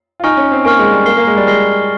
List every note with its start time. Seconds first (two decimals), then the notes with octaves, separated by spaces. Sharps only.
0.20 F4
0.24 D#4 G#5 C#6 F6
0.37 C#4
0.52 C4
0.65 A#3 G#5 C#6 F6
0.79 G#3
0.92 G3
1.06 A#3 F6 C7 G7
1.17 A#3
1.27 G#3
1.37 G3
1.47 G#3 F6 C7 G7